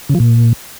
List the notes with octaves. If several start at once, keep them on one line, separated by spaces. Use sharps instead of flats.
C#3
F3
A#2